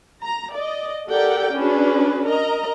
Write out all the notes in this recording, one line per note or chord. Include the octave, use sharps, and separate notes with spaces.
A#5
D5 D#5
G4 A4 A#4 D5 F#5 G5
C#4 D4 F#4 G#4 B4
A#4 D#5 A#5